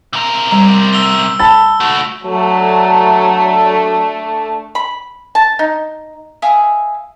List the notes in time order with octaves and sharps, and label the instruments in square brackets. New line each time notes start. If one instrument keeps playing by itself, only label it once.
[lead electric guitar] C3 A#4
[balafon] G3 A#5
[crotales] E6 G7
[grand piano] A5 B5 A6 [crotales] E6
[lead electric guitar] A3 F#4
[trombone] F#3 [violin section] A3 D4
[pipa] B5
A5
D#4
[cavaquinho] E5 F5 G#5 D#6